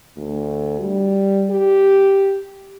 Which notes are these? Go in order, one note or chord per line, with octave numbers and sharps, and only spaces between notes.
D2
G3
G4